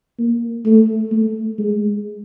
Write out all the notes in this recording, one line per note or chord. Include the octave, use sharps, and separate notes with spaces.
A#3
A3
A3
G#3